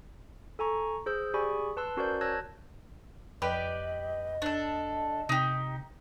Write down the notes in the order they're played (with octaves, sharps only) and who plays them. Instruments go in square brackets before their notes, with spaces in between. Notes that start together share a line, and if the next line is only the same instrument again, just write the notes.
[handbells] A4 G#5 A#5 C#6
G#4 C5 E6 G6
G4 G#4 D5 G#5 B5 C#6
B4 A5 C6 E6 F#6
C#4 F#4 A#4 C5 D5 G6
C#5 A5 E6 F#6 G#6 A#6
[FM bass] F2 [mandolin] G4 B4 D5 [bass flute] D#5
[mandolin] D4 A4
[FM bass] C3 [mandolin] D#4 G4